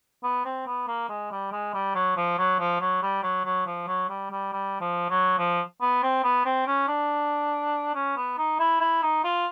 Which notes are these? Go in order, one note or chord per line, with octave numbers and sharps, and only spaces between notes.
B3
C4
B3
A#3
G#3
G3
G#3
G3
F#3
F3
F#3
F3
F#3
G3
F#3
F#3
F3
F#3
G3
G3
G3
F3
F#3
F3
B3
C4
B3
C4
C#4
D4
C#4
B3
D#4
E4
E4
D#4
F4